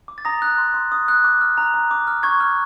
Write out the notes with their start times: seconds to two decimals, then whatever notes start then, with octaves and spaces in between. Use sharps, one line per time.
0.08 D6
0.18 A6
0.25 A#5 D#6 A#6
0.42 F#6
0.58 C6
0.74 C6
0.92 D#6
1.08 F#6
1.24 D6
1.41 F6
1.58 A#5
1.74 A#5
1.91 D6
2.07 F6
2.23 C#6 G#6
2.40 F6